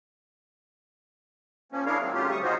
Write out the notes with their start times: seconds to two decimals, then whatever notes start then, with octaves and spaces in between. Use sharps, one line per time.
1.72 F3 A#3 C#4
1.86 D4 E4 G#4 A#4 C#5 F5
2.01 D#3 F#3 A#3 C4
2.14 C#3 F#3 A3 F4 G4
2.31 D2 C#3 G3 C#6 D#6
2.43 D#4 F4 F#4 G#4 C5